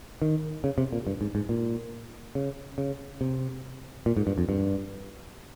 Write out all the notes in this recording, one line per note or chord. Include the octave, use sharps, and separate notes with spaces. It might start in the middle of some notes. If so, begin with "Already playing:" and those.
D#3
C#3
C3
A#2
G2
G#2
G#2
A#2
C#3
C#3
C3
A#2
G#2
G2
F2
G2